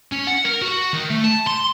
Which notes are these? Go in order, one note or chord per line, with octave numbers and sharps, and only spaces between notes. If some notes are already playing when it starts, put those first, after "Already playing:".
C#4
F#5
A#4
F#4
D#3
A3
A5
C6